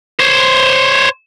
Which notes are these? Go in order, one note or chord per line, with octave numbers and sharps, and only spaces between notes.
C5 C#5